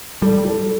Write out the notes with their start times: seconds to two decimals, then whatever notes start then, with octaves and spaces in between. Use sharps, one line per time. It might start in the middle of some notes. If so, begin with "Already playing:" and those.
0.22 G3 A4
0.45 A4